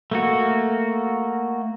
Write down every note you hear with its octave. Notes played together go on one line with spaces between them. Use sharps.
A3 A#3 F#4